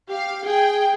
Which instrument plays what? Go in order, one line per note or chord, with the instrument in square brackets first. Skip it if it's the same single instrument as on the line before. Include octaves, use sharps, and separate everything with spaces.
[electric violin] G4 [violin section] F5
[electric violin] G#4 [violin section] G5